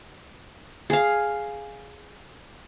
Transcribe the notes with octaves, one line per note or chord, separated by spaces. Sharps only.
G#4 F5